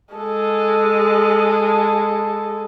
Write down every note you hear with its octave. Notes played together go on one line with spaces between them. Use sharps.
G#3 A4